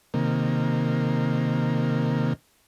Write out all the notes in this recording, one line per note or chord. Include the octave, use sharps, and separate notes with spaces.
C3 D#3 A#3